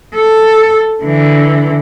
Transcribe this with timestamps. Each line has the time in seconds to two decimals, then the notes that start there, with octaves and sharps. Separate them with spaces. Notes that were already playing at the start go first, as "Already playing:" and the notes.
0.14 A4
1.04 D3 E3